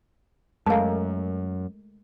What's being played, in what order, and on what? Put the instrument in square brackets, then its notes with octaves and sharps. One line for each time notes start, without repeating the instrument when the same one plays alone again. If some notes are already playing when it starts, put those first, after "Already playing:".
[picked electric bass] F#2 [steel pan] G#3 A3 A#4 [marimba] F5 A5